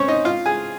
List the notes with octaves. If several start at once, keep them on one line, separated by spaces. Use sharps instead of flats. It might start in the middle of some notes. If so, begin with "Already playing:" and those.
Already playing: C4 C#4 C5 C#5
D#4 D#5
F4 F5
G#4 G#5